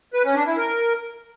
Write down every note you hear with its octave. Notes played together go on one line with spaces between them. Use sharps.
B4
C#4
D4
E4
A#4